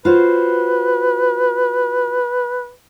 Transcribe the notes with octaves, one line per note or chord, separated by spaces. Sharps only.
F4 F#4 B4 C5